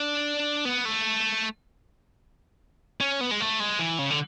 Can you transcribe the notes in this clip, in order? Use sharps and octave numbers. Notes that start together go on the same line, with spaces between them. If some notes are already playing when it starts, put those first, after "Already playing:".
Already playing: D4
B3
A3
C#4
B3
G#3
A3
G#3
E3
C#3
D3